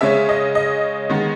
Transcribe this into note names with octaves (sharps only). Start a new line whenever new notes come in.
C#3 G#3 C#4 E5
D#5
D#5
D#3 G#3 B3